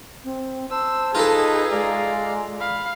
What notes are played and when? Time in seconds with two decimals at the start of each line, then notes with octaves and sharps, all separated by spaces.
0.24 C4
0.71 C5 A5 E6
1.15 D#4 F4 G#4 A4 B4 D#5
1.71 G#3 D5 F5 A#5
2.60 F5 B5